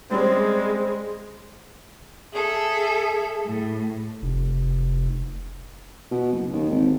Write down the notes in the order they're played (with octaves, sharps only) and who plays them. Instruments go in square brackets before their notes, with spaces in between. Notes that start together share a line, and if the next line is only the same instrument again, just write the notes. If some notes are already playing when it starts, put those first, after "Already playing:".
[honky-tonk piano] G3 C#4 D5 [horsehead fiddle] G#3 [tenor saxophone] C4 [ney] G#4
[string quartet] G#4 A4 E5
A2
[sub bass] F1
[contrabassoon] B2
F#1
D#2
G#1